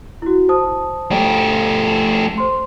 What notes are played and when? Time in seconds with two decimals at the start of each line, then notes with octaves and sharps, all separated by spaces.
0.22 E4 F#4
0.49 C5 A5 D#6
1.12 A3 G4
2.38 C5 C6